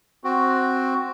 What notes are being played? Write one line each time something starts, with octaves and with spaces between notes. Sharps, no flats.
C4 F#4